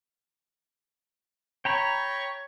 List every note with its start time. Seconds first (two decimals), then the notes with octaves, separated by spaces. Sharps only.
1.65 C#5 G5 A#5 B5